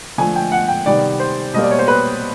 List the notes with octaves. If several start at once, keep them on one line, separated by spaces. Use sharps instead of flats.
D3 F3 A3 G#5
G5
F#5
G5
C3 D#3 G3 B3 D5
C5
B2 G3 A#3 D#5
D5
C#5
C5
B4